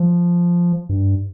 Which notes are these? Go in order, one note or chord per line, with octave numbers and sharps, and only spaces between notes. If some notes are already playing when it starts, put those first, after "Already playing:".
Already playing: F3
G2